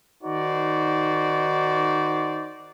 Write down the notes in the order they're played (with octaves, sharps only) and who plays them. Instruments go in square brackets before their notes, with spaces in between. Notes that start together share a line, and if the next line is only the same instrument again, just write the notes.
[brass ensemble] D#3 D#4 F#4 C5 D5